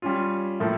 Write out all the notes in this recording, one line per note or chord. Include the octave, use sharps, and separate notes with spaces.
G3 C#4 F4
A2 F3 A#3 E4 A4